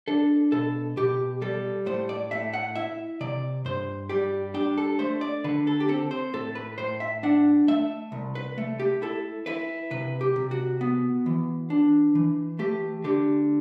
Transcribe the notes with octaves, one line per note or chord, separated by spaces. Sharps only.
D4 A4
B2 A4
B2 G4
G3 A4
A2 C5
D5
A2 E5
F#5
E4 E5
C3 D5
G2 C5
G3 G4
D4 G4
A4
A3 C5
D5
D3 B4
A4
G4
C4 A4
C5
A2 A4
B4
A2 C5
E5
D4 F#5
A3 E5
C2
B4
A3
G4
E4 A4
E4 B4
C3 B4
G4
C3
F#4
B3
E3
D4
E3
A3 G4
D3 G4